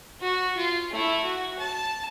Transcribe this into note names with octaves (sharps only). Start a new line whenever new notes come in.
F#4
F4
A3 E4
F#4
A5